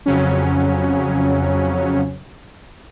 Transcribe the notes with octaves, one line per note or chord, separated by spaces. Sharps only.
F2 C#3 F#3 C#4